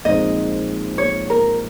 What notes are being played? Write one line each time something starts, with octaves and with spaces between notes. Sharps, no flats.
A#1 A#2 G#3 C4 D#4 D#5
C#5
A#4